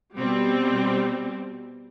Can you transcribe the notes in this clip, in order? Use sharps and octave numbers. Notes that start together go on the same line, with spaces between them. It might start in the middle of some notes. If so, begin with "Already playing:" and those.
B2 G3 C4